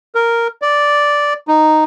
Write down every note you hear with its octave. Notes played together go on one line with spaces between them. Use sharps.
A#4
D5
D#4